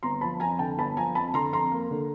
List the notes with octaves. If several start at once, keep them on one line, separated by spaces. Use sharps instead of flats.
G1 A#5 C6
F3 A5 B5
F2 G#5 A#5
D3 G5 A5
G1 A5 B5
F3 G#5 A#5
F2 A5 B5
D3 A#5 C6
F2 A#5 C6
A#3
D3